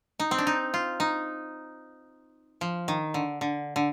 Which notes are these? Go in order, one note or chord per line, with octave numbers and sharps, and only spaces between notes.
D#4
C4
D4
D#4
F4
D#4
F3
D#3
D3
D3
D3